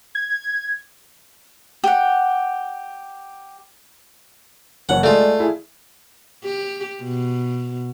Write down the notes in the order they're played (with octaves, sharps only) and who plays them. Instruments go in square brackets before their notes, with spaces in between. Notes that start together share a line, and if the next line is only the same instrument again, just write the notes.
[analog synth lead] G#6
[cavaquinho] G4 F#5
[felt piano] F#1 C#5 [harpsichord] F#5
[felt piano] G#3 G#4 D5 [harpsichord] A3 F4
[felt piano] E4 G#4
[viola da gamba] G4
B2